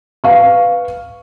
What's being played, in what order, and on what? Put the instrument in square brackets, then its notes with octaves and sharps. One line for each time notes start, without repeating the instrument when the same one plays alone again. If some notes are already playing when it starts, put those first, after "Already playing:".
[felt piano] B4 F5 C#6